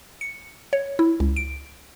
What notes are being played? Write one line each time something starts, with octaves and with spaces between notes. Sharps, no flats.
C#7
C#5
E4
C#2
D7